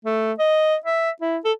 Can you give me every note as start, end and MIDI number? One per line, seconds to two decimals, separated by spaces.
0.05 0.33 57
0.39 0.76 75
0.86 1.10 76
1.21 1.38 64
1.44 1.52 69